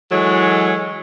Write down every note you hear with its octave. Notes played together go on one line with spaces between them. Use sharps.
E3 F#3 G#3 A4 C#5